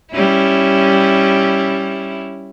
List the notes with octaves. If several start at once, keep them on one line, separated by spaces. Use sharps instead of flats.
G3 C#4 E4